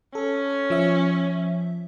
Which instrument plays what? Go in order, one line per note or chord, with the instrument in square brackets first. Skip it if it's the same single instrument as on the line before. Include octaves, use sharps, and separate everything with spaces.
[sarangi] C#4 [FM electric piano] A4
[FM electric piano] F3 E5